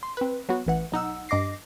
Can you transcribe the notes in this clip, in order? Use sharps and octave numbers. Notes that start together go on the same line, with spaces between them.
C6
C4 B4
F#3 B3 F#4
A1 E3 F#5
B1 D#4 F#5 E6
G2 D#5 D6 A#6 C7